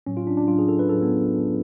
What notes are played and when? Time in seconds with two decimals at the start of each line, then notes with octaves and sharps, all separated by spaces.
0.07 A2 F#3 C#4
0.17 F4
0.27 D4
0.37 D4
0.48 A2 F#3 F4
0.58 G#4
0.69 A4
0.79 B4
0.89 A2 F#3 A4
1.02 B3